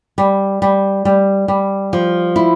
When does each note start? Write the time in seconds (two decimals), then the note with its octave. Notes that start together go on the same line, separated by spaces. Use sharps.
0.18 G3
0.62 G3
1.05 G3
1.48 G3
1.93 F3
2.36 E4